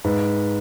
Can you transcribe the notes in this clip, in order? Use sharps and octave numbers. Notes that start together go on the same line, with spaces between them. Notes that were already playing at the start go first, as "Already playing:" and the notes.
G#2 B4